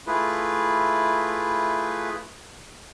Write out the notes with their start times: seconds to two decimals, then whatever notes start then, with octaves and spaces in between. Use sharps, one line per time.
0.07 A3 E4 F4 G#4 B4